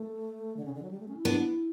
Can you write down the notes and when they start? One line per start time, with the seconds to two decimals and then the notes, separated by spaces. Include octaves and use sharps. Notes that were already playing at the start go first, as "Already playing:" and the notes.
Already playing: A3
0.57 D3
0.65 C#3
0.74 D3
0.83 F#3
0.91 G3
1.00 A3
1.08 C#4
1.17 E4
1.25 B3 D4